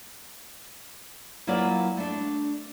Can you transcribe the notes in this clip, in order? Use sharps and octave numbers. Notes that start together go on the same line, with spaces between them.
F#3 A#3 E4 F4 B4 D5
A3 D4